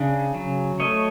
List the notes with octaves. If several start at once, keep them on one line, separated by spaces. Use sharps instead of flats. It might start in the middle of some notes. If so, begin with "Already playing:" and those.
Already playing: C#3 D4
F#3
A3 C#5 D#5